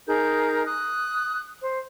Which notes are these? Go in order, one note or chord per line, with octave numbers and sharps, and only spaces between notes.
D#4 G#4 A#4 G6
D#6 F#6
C5